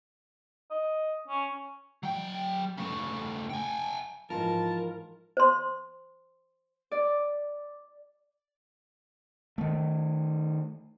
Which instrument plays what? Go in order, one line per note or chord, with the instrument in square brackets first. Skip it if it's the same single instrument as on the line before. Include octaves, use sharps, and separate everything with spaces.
[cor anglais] D#5
C#4
[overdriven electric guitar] F#3 G5
C#3 A3
G5 G#5
[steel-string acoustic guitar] G#2 E3 F4 [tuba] F3 [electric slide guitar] A#4 [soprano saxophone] A5
[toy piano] C5 C6
[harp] D5
[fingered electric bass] D#3 A3